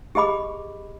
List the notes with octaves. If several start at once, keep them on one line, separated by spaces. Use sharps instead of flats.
G4 G#4 D#5 B5 D6